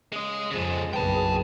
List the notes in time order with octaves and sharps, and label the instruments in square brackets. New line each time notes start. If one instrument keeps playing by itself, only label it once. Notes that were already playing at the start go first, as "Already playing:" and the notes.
[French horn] C#3 [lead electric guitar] G#3 D#5
[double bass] F2 [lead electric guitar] C#3 F3 [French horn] G#3 [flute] G#4
[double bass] F#1 B1 [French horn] B4 [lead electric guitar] G5 A5